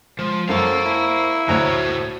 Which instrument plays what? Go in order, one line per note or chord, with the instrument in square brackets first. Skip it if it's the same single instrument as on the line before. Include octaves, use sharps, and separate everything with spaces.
[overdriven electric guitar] F3 [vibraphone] G#3
[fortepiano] F#2 [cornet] A4 [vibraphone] C5 C#6 [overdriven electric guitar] F5 A#5
[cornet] E4
[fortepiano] D2 A#5 F#6 [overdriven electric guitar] A2 C#5 [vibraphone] F#4 C5